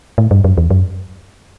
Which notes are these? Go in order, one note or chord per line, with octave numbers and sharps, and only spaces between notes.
A2
G2
F#2
E2
F#2